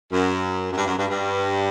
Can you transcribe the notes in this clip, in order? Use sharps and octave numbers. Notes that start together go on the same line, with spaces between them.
F#2
F#2
G2
F#2
G2
G2